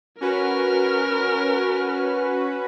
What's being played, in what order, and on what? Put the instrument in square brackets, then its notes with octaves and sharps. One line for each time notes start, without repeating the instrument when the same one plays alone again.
[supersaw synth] C#4 F#4 B4 [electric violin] A#4 F6